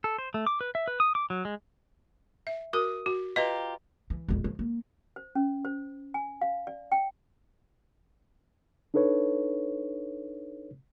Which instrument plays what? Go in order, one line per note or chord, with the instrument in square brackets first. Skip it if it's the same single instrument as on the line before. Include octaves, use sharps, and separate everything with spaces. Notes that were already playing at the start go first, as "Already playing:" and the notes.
[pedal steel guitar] A4
C5
A3
D6
B4
E5
B4
D#6
D6
F#3
G#3
[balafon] E5
[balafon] F#4 A#4 [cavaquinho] D#6
[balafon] F#4
[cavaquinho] F4 G4 A#5 [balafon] B4 D#5
[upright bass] E3
E1 A#1
F3
A#3
[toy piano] C5
C#4
C5
G#5
F5
D5
G5
[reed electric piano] D4 D#4 A4 B4 C#5